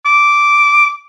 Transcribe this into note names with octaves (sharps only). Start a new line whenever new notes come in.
D6